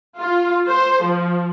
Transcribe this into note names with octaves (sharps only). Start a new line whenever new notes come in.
F4
C5
F3